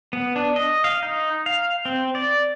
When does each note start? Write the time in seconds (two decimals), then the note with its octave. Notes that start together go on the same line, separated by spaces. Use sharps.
0.13 B3
0.36 D4
0.56 D#5
0.84 F5
1.03 D#4
1.46 F5
1.85 C4
2.15 D5